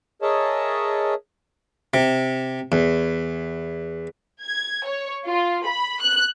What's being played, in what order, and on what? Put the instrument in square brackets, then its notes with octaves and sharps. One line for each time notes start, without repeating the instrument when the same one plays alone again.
[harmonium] G#4 A#4 C#5 D#5 E5 A5
[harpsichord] C3
E2
[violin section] G#6
C#5
F4
B5
F#6